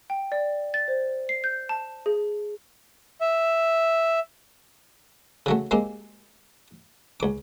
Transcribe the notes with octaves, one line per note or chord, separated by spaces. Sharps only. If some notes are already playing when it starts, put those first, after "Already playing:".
G5
D5
A6
C5
C7
G6
A5
G#4
E5
C#3 F#3 A3
G#3 A#3 C4 G4
C#2 D6